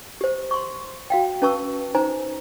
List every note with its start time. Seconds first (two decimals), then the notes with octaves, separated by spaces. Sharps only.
0.21 G4 C5
0.51 C6 C#6
1.10 F#4 F5 G5
1.42 C#4 B4 A5 C#6 E6
1.95 D#4 C5 G#5 A#5